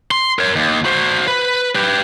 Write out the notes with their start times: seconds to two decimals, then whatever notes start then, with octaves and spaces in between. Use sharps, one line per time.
0.11 C6
0.39 A#4 C#5
0.55 D#2
0.85 F#4 C5
1.28 B4
1.75 G4 B4